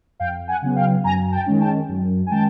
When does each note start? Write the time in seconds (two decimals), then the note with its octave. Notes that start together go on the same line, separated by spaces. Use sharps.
0.20 F2 F5 G5
0.48 F#5 G#5
0.62 C#3 F#3 B3
0.76 F5 G5
1.04 F#2 G#5 A#5
1.32 G5 A5
1.46 D#3 G#3 C#4
1.60 G5 A5
1.89 F#2
2.26 G#5
2.30 D#3 G#3 C#4 G5 A5